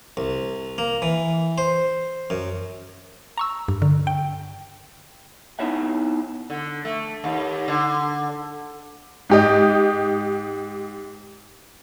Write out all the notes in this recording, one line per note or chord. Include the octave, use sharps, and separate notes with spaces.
C2
A#3
E3
C5
F#2
A#5 C#6 E6
G2
D3
G5
B3 D#4 E4 C#5 E5 F#5
D3
A3
D#2
D3
G#2 G4 D#5